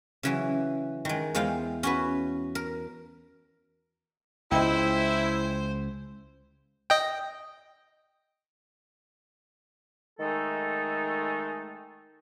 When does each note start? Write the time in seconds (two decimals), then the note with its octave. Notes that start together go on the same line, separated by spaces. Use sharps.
0.23 C#3 E3 F#3
1.05 D#3 G#3
1.35 E2 G#3 F4 C5 F5 G5
1.83 C#4 F#4 B4
2.55 A#4
4.52 C#2 E4 C5 D#5 G5
6.90 D#5 G5
10.20 D#3 G#3 A3 D#4 A4